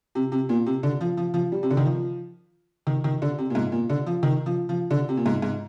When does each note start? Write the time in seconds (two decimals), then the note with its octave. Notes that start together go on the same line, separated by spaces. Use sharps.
0.15 C3
0.32 C3
0.49 A#2
0.66 C3
0.83 D3
1.01 F3
1.17 F3
1.34 F3
1.52 G3
1.63 C3
1.70 D3
1.77 D#3
1.85 F3
2.87 D#3
3.04 D#3
3.22 D3
3.38 C3
3.50 A#2
3.55 G#2
3.72 A#2
3.89 D3
4.06 F3
4.23 D#3
4.46 F3
4.69 F3
4.91 D3
5.09 C3
5.17 A#2
5.26 G#2
5.42 G#2